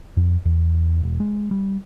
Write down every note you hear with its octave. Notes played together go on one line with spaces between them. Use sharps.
F2
E2
E1
G#3
G3